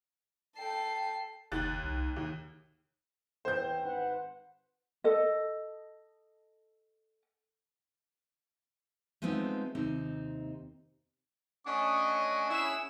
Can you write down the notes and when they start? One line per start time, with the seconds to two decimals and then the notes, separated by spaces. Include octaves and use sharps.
0.58 A4 G5 C7
1.52 F#1 D#2 F#6 A6
1.83 C2
2.16 D#2 D#3
3.45 E2 C#4 C5 G5 G6
3.83 G#1 B4 F#5
5.04 A4 D#5
9.22 F3 G#3 A3 B3 C4 D#4
9.75 D#2 C3 C4 D#4
11.66 A3 C#4 D4 D#5 F#5 G#5 C#6
12.50 E4 G#4 E6